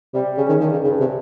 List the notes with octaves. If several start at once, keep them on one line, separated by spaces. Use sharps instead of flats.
C3 G3
C#3 C#4
D#3
G2 D#3
C#3
G2 C#3
C3